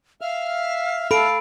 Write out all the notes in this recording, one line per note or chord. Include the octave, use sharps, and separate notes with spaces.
E5 F5 F6
A4 F5 B5 D7